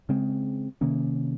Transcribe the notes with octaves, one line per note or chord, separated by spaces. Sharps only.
C#3 G#3 C4
C3 D#3 A#3 C#4